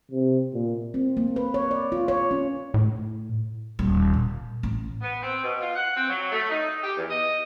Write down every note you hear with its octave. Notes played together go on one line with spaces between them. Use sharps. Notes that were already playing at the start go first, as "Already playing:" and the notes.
C3
A#2
C4
A#3
B4
C#5
D5
F4
C#5
C#4
A2
D#1 G3
A#2
A1
B3
C4
B2
F4
F#5
C4
F#3
A3
D#4
G4
E2
D#5